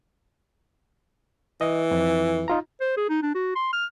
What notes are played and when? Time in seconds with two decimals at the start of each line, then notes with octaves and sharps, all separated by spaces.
1.61 E3 D#5
1.91 F2
2.48 D#4 F4 A#5
2.81 C5
2.97 G#4
3.09 D#4
3.22 D4
3.35 F#4
3.55 C6
3.73 F6